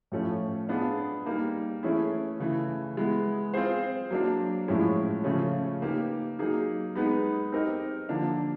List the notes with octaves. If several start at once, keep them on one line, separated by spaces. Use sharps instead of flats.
A2 F3 A3 C#4
B3 D4 F4 G#4
G3 A#3 D#4
E3 A3 C#4 E4 G#4
C#3 E3 A3
E3 G#3 B3
C4 F4 G#4 C5
F#3 A#3 D4
A2 F3 G#3 C#4 E4
C#3 F3 A3 C#4
A#3 D#4 G4 B4
F#3 A#3 D#4 G#4
G#3 B3 D#4 G#4 B4
C4 D#4 G4 A#4 D#5
D3 F3 A#3 D4